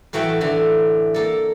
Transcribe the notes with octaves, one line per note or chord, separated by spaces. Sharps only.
A2 E3 F#3 E5 F#5 G5
D3 E3
A#3 A4